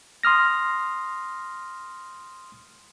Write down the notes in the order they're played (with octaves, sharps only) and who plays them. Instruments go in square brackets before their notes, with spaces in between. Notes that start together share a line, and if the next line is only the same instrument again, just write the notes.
[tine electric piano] C6 D#6 F6 A#6